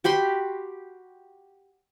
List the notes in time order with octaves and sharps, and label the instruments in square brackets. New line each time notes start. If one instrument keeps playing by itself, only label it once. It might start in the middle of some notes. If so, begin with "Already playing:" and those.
[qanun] F#4 G4 B5 C6